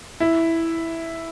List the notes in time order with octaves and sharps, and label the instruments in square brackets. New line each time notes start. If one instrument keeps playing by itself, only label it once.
[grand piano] E4